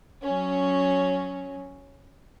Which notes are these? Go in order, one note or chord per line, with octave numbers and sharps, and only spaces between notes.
F#3 C#4